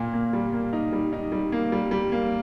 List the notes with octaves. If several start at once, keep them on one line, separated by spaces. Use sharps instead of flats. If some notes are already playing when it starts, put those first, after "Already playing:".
Already playing: A#2 A#3
A#3
G3
A#3
D#4
G3
D#4
G3
A#3
G3
G3
A#3